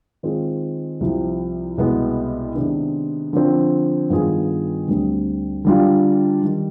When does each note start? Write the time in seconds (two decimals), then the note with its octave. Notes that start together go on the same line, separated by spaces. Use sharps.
0.23 D#3 G#3 C4 F4 G#4
1.01 C2 C3 F3
1.78 C2 B2 G#3 B3
2.55 C3 D#3 G#3 B3 D4
3.33 D3 F3 C4
4.10 G2 D#3 B3 F4 G#4
4.88 D2 D3 G3 C4
5.65 D3 G3 D4 F4
6.42 D#3 G3